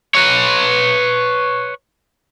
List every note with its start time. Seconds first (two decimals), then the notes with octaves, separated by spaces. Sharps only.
0.15 B4 C#5